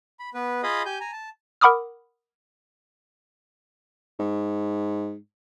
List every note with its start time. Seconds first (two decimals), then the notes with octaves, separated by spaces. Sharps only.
0.19 B5
0.34 B3 B4
0.63 F4 G#4 D#5 F5 B5 D#6
0.85 G4 G#5 G6
1.00 G#5 A#5
1.12 A5
1.61 A#4 F#5 B5 D6 D#6 F6
4.20 G#2